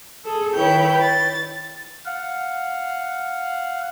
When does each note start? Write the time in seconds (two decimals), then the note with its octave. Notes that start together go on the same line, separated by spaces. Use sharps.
0.25 G#4 A4
0.54 D#3 E4 B4 C#5 G5 G6
1.01 A6
2.05 F5 F#5